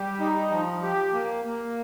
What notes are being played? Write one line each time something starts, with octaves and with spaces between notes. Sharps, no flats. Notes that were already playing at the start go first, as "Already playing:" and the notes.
Already playing: G3 G4
D#4
F3
G4
A#3
A#3